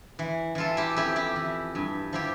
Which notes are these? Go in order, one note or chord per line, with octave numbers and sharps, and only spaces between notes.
E3
E3 F4 A4
E4 G4
F2 E4 G4
E4 G4
E3
G2
F3 E4 G4